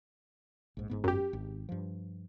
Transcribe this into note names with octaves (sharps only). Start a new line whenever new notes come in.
A#1 G#2
G1 G#2 B3
F#2 G4
G#1
G2 F3